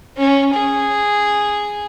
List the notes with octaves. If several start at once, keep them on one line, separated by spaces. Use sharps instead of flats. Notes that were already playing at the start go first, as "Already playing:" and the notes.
C#4
G#4